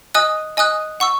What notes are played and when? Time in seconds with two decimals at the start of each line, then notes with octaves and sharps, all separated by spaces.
0.15 D#5 G#5 D#6 F#6
0.57 D#5 G#5 D#6 F#6
1.00 F#5 C#6 E6